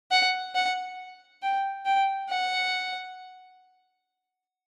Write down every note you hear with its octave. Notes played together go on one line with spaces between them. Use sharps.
F#5
F#5
G5
G5
F#5